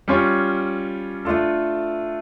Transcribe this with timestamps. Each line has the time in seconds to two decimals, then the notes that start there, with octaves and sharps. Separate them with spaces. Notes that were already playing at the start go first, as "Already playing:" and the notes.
0.08 G3 C#4 F4 C#5
1.25 A3 D4 F4 A4